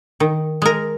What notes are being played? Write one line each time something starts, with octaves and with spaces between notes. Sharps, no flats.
D#3
G#3 A#4